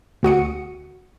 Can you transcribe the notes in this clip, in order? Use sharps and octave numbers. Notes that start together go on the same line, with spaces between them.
D2 F#4 D#6 C#7